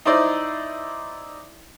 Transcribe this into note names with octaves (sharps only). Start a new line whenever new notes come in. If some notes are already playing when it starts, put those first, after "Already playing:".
D#4 E4 C5 D5 D#5